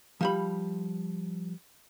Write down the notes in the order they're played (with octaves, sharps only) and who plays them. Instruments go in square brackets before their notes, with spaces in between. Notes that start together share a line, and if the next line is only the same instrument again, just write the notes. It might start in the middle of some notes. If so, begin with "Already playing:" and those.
[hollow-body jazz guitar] F3 G3 B5